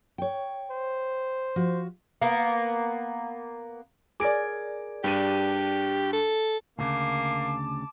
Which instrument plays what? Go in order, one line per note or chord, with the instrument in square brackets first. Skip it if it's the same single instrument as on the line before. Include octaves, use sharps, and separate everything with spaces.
[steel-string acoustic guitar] C#5 G5
[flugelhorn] C5
[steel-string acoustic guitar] F3 F#4
[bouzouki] A#3 B3
[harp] G#4 A#4 D5 [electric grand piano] D6 D7
[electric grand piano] G2 D4 D#7 [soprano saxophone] G4
[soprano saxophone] A4
[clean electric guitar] D2 A#2 C#3 [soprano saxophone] A#3 [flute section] A5 D6